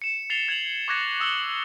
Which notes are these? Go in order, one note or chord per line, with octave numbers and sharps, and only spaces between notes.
C#7 E7
A6 C7 F7 G7
G#6 F7 F#7
C#6 D6 F#6 G#6 A#6 C#7
D#6 E6 F#7 G7